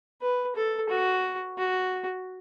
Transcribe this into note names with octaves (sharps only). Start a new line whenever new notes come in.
B4
A4
F#4
F#4